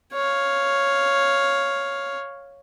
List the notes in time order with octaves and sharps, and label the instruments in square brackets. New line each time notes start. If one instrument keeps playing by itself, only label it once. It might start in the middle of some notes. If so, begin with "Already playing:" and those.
[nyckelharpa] C#5 F5